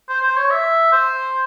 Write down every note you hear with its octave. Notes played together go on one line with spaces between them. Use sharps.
C5
C5
C#5
E5
C5